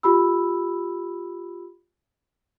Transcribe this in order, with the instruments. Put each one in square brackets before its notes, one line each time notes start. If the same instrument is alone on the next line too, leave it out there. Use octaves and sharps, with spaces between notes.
[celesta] F4 G4 B5 E6